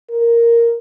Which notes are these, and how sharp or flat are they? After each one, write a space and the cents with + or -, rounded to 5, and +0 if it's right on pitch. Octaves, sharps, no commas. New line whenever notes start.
A#4 +0